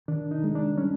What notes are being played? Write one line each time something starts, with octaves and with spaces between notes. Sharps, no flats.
D#3 D4
D#4
G#3
D4
G3 C#4